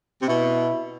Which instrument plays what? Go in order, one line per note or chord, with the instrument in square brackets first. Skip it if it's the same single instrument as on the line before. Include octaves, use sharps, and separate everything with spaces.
[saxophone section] C3
[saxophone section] B2 [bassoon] E4